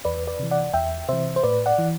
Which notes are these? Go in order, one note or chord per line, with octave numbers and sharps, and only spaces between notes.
E2 B4 D5
B4 D5
C3 E3
D5 F#5
E2 E5 G5
C3 E3 C5 E5
C5
A2 B4 D5
D5 F#5
E3